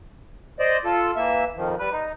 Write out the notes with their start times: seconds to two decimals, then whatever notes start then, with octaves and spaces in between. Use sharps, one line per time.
0.59 C5 D5 D#5
0.85 F4 A4
1.16 E3 A#3 E5
1.57 F2 D#3 F3
1.79 G3 B4
1.92 D#4